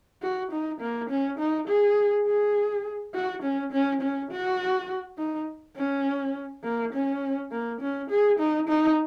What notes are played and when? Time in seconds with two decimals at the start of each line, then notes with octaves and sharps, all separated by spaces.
0.22 F#4
0.52 D#4
0.81 A#3
1.10 C#4
1.39 D#4
1.68 G#4
2.27 G#4
3.14 F#4
3.43 C#4
3.72 C#4
4.01 C#4
4.31 F#4
5.18 D#4
5.76 C#4
6.64 A#3
6.93 C#4
7.51 A#3
7.81 C#4
8.10 G#4
8.39 D#4
8.68 D#4